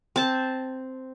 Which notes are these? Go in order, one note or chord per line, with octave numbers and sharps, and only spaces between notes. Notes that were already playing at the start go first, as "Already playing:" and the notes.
C4 A5